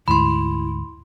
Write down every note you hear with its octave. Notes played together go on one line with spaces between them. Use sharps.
D2 G#2 E4 B5 C6